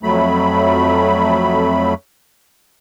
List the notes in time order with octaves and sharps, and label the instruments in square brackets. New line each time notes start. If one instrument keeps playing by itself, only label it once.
[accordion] F2 F#3 A3 B5